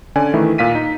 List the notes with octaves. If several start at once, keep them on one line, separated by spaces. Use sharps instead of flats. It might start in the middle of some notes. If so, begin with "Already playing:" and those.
D3 C#4 D5 G#5
D#3 E3 A3 E4
A#2 F5 B6 D#7
D#4